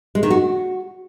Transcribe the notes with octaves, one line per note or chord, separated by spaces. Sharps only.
G#3
D#3
F#4